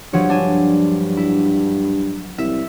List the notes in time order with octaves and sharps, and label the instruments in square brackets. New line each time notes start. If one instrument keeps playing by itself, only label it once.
[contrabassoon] G2 [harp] F3 F#3 C#5
[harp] D4 G#5
E4
[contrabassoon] C2 [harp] E5